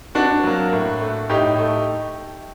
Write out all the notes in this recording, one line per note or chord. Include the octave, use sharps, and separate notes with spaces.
C3 D4 F#4
F#3 A#3
A2
A3
A2 D#4 G4
A3